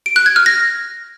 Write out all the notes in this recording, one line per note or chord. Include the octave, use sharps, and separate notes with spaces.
D7
F#6
G#6
F6
A#6